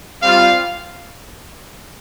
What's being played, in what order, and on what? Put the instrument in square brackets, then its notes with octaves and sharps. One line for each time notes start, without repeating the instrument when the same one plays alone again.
[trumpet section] G3 C4 F4 F5